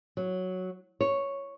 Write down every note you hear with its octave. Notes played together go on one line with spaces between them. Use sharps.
F#3
C#5